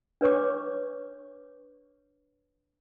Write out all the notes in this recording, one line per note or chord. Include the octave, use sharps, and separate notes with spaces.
D4 B4 C#5 C#6 D6